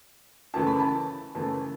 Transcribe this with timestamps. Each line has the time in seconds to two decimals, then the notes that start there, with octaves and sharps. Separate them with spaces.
0.54 F#2 C#3 E3 A3 A5
0.67 B5
0.80 A5
1.35 F#2 C#3 E3 A3 A5